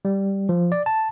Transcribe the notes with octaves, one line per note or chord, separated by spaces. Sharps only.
G3
F3
D5
A5